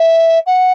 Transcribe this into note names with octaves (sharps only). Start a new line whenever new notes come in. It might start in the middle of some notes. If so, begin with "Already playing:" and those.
Already playing: E5
F#5